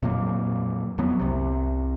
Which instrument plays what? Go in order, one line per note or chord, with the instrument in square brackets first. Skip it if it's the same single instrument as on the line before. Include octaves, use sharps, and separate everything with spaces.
[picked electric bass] F2 A#2 F#3 A#3
F2 F#3 B3
C2 C3